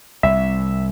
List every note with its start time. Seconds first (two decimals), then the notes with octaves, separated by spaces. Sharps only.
0.23 C2 E5